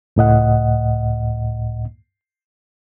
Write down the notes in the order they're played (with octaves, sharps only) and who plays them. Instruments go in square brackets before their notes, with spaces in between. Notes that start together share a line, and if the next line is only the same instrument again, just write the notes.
[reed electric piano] C#2 A2 D#5 F#5